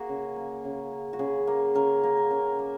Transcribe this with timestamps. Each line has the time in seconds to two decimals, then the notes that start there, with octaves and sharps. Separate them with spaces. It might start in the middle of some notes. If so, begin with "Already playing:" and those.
Already playing: A#3 F#4 G#4
0.09 C#3
0.36 A#3
0.65 C#3
0.91 A#3
1.13 F#4
1.19 C#3 G#4
1.47 A#3
1.75 C#3 A#4
2.03 A#3 A#4
2.17 A#4
2.31 C#3 A#4
2.59 A#3